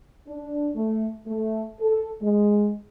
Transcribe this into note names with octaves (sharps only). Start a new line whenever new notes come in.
D4
A3
A3
A4
G#3